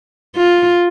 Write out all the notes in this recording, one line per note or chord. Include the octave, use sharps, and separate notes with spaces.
F4